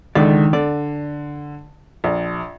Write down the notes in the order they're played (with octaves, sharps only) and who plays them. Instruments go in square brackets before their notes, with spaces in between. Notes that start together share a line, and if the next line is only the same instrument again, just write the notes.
[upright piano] C#2 D3 [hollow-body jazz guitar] D#3 D5
[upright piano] D3 [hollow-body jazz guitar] D5
[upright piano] A#1